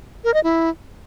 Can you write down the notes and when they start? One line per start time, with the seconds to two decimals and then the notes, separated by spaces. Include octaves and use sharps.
0.24 A#4
0.34 D#5
0.44 E4